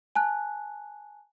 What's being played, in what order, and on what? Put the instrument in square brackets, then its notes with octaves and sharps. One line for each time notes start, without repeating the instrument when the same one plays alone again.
[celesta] G#5 A5 F#6